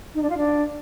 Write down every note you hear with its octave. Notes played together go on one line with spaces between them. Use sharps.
D#4
D4
F4
D4